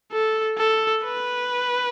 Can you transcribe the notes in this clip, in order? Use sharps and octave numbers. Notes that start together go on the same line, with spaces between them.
A4
A4
B4